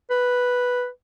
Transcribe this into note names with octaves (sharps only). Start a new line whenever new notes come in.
B4